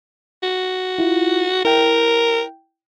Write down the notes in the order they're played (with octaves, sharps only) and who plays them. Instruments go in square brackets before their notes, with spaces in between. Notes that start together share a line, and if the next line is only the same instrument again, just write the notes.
[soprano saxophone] F#4
[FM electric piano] E4 F4
[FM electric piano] E4 G5 [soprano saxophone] A#4